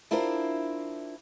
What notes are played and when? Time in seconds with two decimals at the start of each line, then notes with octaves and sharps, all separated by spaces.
0.11 D4 E4 F4 G4 A#4 C5